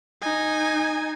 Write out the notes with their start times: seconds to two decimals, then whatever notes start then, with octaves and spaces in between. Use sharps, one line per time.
0.22 D#4 G#5